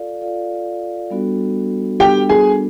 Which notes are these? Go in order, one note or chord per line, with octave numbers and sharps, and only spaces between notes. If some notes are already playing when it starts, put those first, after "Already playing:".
Already playing: F4 A4 D5 F5
F4 A4 D5 F5
G3 B3 D4 F#4 A4
G3 B3 D4 F#4 G4 A4 G5
G#4 G#5